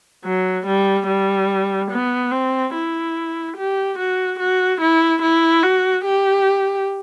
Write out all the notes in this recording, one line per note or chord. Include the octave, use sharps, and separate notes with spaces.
F#3
G3
G3
B3
C4
E4
G4
F#4
F#4
E4
E4
F#4
G4